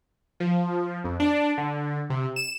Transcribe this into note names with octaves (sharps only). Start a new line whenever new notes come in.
F3
F2
D4
D3
C3
E7